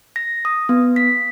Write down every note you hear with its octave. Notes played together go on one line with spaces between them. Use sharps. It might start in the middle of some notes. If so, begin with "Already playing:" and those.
A#6
D#6
B3
B6